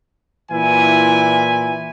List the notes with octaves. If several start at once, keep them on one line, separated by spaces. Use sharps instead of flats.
A#2 E3 E4 G#5